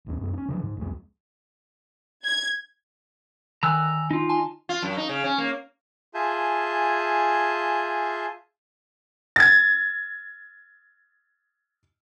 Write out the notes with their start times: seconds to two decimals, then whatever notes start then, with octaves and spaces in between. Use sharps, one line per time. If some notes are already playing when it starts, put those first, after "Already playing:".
0.06 A1 D#2 C4
0.21 F#2 B3
0.33 C#4 D4
0.48 D3 F3 F#3
0.63 G#2
0.77 C2 F2 G#3
2.24 G#6
3.63 D3 D#3 G#5 A#5 E6 F#6
4.11 D#4 F4
4.29 G#5 A5 C6
4.69 F4
4.82 F#2
4.97 D#4
5.09 C#3
5.24 C#4
5.38 A#3
6.14 F4 G#4 E5 G#5 A5 G6
9.36 G#6 A6